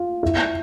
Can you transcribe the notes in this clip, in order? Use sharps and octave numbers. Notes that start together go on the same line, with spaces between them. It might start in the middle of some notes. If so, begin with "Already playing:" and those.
Already playing: F4
E4